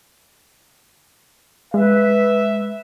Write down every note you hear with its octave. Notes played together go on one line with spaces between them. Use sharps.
G#3 B4 E5